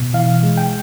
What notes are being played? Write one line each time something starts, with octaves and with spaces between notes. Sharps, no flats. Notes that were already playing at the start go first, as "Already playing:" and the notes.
Already playing: B2
E3 F5
G#3
G5